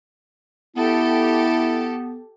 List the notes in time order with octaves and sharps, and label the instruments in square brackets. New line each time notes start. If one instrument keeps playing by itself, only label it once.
[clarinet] B3 [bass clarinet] E4 [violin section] G4 A4